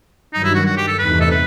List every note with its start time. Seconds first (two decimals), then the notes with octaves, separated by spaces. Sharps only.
0.33 G2 D#3 F#3 D#4
0.44 E4
0.55 F#4
0.66 F#4
0.77 G4
0.88 A4
0.99 E2 C3 E3 A3 D#4 B4
1.21 A4
1.31 B4